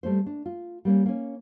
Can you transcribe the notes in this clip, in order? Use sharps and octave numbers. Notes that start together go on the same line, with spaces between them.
G3 A3 C#4 C5
D4
F4
G3 A#3 C#4
A#3 C#4